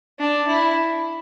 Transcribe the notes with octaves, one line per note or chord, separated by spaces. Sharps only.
D4
E4